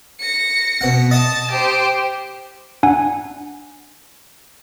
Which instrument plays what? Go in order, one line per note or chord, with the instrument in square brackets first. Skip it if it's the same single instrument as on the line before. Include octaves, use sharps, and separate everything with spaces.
[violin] A#6 C#7
[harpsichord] B2 F#5
[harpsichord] D#5 [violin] A5 A6
[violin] G4 C5
[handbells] D4 F#5 G#5